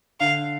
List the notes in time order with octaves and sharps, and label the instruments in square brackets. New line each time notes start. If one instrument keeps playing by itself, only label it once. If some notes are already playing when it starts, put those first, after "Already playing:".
[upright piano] D3 [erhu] F5